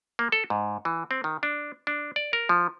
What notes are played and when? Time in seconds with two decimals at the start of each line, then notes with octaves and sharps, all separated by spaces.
0.19 A#3
0.32 A4
0.50 G#2
0.85 E3
1.11 C4
1.24 D#3
1.43 D4
1.87 D4
2.16 D5
2.33 A#4
2.49 F3